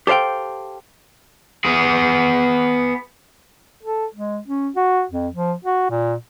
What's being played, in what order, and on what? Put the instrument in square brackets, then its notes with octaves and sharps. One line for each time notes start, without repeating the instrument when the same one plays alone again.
[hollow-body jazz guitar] G4 A4 C5 F5 G5
[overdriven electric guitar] B3 G#4
[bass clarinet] A4
G#3
C#4
F#4
F2
F3
F#4
A#2